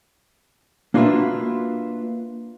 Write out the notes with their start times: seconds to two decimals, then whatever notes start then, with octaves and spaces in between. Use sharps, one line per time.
0.94 A#3 D4 F4 F#4 B4 E5